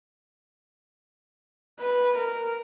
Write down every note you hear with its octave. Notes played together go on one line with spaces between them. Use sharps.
B4
A#4